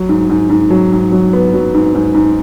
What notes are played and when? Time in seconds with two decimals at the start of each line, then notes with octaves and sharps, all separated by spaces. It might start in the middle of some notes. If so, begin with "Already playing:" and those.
Already playing: F#3
0.09 G#2
0.29 G#2
0.50 G#2
0.70 F#3
0.92 G#2
1.12 F#3
1.33 B3
1.54 F#3
1.74 G#2
1.95 G#2
2.14 G#2